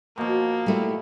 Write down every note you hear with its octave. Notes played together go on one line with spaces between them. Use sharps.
B2 F3 A#3
G3 A3 E4